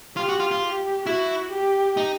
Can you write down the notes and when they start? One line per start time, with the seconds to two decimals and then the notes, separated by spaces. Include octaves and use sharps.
0.17 F4 G4
0.29 F#4
0.40 F4
0.51 F4
0.63 G4
1.06 E4 F#4
1.52 G4
1.97 D#4